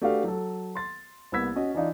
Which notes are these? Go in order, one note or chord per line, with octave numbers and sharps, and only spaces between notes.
A3 D4 F#4 G4 B4 F5
F#3 A4
C6 A6
C2 A#3 B3 E6 G#6 B6
C#4 F#4 D#5
E3 D4 D#4 F4